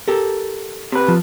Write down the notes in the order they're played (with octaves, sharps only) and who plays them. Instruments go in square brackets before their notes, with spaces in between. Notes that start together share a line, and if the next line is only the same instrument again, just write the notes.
[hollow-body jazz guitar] G4 A4 A#4
[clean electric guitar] C3 B4
[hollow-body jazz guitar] F3 F4 A5